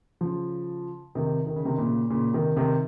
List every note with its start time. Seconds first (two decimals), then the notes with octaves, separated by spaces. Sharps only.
0.21 C#3 F3
1.15 C3 D#3
1.47 D#3
1.56 C#3
1.65 C3 D#3
1.78 A#2 C#3
2.10 A#2 C#3
2.34 C3 D#3
2.57 C3 D#3